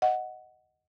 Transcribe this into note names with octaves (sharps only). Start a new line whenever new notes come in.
D#5 F#5